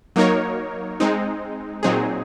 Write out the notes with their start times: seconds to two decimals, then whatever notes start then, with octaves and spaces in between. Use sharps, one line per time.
0.16 F#3 A#3 D#4 A#4 C#5
1.00 G#3 C4 D#4
1.83 A#2 F#3 C4 D#4 G#4